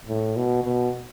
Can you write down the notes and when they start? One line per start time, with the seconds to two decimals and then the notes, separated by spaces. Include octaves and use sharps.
0.08 A2
0.36 B2
0.64 B2